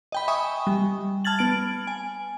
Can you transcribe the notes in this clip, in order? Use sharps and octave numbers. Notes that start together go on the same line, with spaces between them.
D#5 G5 B5
E5 G#5 B5 C#6 D#6
G3
A5 F6 G#6 A6 F#7
B3 D7
G#5